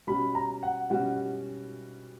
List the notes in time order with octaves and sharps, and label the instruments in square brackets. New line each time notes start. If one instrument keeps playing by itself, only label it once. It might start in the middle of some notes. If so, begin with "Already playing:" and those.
[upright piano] B2 G3 C#4 F#4 [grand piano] B5
[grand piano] A#5
F#5
[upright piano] B2 G3 C#4 F#4 [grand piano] F#5